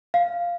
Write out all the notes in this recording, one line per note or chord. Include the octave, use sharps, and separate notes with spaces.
F5